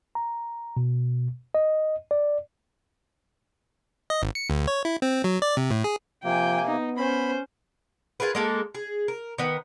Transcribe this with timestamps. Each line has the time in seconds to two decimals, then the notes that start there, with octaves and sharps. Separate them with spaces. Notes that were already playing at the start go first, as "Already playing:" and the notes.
0.15 A#5
0.77 B2
1.55 D#5
2.11 D5
4.10 D#5
4.22 G#1
4.35 C#7
4.50 D2
4.67 C#5
4.85 E4
5.02 C4
5.24 F#3
5.42 D5
5.57 C3
5.71 A2
5.84 G#4
6.24 C3 F3 A#3 G5 G#5
6.67 B3 D#4
6.97 C#4 C5 B5
8.20 F4 G#4 A#4 B4
8.35 G#3 A#3 A4
8.75 G#4
9.08 A#4
9.38 D#3 B3